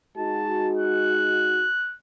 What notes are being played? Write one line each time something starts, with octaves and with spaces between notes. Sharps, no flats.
G#3 D#4 F#4 A5
F#6